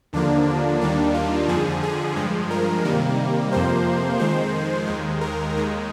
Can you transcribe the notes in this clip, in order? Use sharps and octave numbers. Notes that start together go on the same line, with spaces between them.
D#2 D3 F3 A#3 D4
D#2 D#3 G3 A#3 D4
F4
F2 D3 F3 G#4
G#4
G2 F3 G#3
A#4
C3 D#3 G3 A#3
F2 C3 F3 A#3 C5
F2 D#3 G#3 C5
D#2 D#3 G#3
A#4
D#2 D#3 G#3